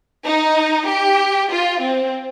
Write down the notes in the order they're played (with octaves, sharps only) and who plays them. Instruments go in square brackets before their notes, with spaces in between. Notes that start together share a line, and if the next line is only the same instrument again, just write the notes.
[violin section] D#4
G4
F4
C4